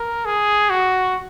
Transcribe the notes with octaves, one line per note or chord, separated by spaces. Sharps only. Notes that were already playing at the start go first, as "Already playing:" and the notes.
Already playing: A#4
G#4
F#4